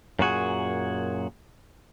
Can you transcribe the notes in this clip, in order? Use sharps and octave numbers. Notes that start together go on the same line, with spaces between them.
F#2 A#2 F#4 G#4